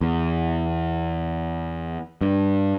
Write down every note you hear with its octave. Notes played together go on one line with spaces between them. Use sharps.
E2
G2